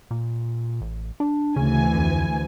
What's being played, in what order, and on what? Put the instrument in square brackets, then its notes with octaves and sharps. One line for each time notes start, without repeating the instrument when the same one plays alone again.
[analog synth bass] A#2
A1
D4
[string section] D2 E3 G#5 [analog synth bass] C#3
[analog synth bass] F2